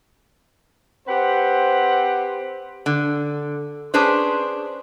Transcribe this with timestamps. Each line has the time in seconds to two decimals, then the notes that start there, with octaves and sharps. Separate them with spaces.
1.08 C4 G4 B4 C5 F#5
2.86 D3
3.94 C#4 D4 G#4 B4 C5